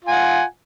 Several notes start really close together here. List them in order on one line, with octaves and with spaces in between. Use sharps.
F4 G#5 F#5